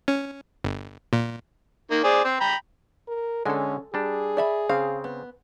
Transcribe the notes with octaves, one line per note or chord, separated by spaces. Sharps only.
C#4
G1
A#2
D#3 A#3
G#4 C5 D5
C4 C5
G5 A#5 B5
A#4
D3 G#3 C#4 A4 G#5
G3 D4 G#4
D5 E5 B5
C#3 C4 F5
B3